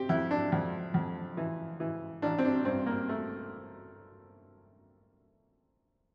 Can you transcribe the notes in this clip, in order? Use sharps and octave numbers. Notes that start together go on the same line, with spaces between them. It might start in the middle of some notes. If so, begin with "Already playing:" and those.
Already playing: C4 G4
F2 E4
D4
F2
F2
E3
E3
A1 D4
C4
D4
G2 C4
A#3
A3